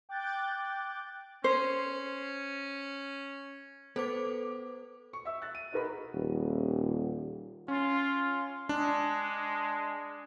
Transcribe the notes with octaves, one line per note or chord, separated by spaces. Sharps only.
G5 D6 F#6 G6 A6
C#4 C5
B3 A4 C5 D6
C#6
E5 E6
F#6 A6
D#7
D#4 F#4 G#4 A#4 B4 B5
D#1
C#4 F4
G#3 D4